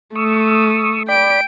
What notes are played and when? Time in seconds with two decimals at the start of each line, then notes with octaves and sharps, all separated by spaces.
0.15 A3 C#6 D#6 E6
1.08 D5 G5 B5 D7